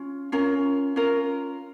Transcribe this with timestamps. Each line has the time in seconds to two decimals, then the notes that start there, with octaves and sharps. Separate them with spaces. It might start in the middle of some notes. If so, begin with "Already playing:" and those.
Already playing: C#4 F4
0.32 C#4 F4 A#4
0.96 C#4 F4 A#4